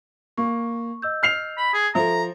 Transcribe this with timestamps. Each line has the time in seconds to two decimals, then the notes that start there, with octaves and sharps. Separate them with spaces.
0.38 A#3 C#6
1.02 D#5 E6 G6
1.23 F6 C7 F7
1.58 B5
1.74 G#4
1.95 F3 A4 E5 A#5